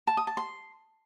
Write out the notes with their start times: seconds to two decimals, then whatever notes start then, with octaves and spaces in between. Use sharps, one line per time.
0.07 A5
0.17 D#6
0.27 A5
0.37 C6